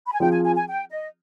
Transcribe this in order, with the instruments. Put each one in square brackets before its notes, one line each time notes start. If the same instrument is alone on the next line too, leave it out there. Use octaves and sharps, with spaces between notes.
[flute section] B5
G#5
[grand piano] F3 C4 F4 G#4 [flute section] G5
[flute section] G#5
G#5
G#5
G5
D#5